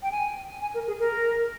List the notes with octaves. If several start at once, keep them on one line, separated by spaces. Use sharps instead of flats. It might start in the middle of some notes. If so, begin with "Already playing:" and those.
G5
G#5
G#5
A#4
G#4
A#4